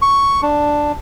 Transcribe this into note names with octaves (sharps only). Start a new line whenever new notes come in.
C#6
D4